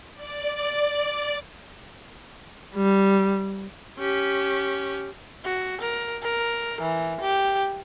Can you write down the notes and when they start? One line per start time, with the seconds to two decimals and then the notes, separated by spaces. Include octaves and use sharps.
0.14 D5
2.76 G3
3.99 C#4 G4
5.45 F#4
5.81 A#4
6.23 A#4
6.80 E3
7.21 G4